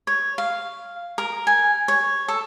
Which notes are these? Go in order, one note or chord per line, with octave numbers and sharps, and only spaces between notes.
C#5
F5
A#4
G#5
C#5
A4